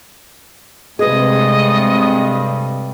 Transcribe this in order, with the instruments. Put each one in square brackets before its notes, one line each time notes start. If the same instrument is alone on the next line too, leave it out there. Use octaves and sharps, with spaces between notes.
[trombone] G2 [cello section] C3 G#3 A3 [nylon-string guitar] G#4 B4 [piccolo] D#5